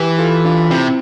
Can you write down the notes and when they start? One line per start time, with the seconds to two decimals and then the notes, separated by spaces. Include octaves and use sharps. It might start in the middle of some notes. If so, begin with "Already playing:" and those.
Already playing: E3 G4 B4
0.18 F4 A4
0.45 D4 F4
0.70 C3 C4 E4